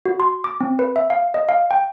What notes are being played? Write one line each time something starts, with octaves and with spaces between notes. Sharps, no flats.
F#4
C6
D6
C4
B4
E5
F5
D#5
F5
G5